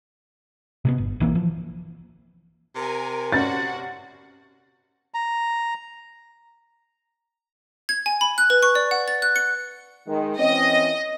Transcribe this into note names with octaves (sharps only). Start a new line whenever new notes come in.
C3 A#3 B3
G1
A#1 E3 A#3 C4
E3 F3
C3 A#4 G#5
C#4 F#4 D5 F#5 A6
A#5
G#6
G#5
B5
F#6
B4
C#6
D5
F#5
A6
F#6
C#7
D#3 G#3
E3 C4 C#4 D#5